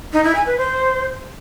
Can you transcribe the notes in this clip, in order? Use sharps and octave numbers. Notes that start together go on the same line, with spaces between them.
D#4
E4
G#5
B4
C5